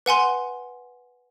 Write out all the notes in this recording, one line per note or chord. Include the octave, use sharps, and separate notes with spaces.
B4 F#5 G#5 C6